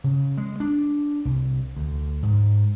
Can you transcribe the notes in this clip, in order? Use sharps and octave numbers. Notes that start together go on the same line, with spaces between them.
C#3
G#3
D4
C2
D2
G#2